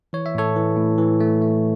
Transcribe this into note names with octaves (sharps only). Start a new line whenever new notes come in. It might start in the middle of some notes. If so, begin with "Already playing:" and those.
E3 C#5
E5
A2 A4 C#5
E3
A2
E3
A3
A3